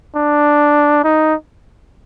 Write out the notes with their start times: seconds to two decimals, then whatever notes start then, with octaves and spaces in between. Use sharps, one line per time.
0.16 D4
1.04 D#4